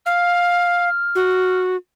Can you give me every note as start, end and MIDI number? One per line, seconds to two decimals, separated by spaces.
0.06 0.89 77
0.06 1.59 89
1.15 1.77 66